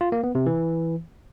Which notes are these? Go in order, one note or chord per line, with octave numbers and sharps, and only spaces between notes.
F4
A#3
B3
C3
E3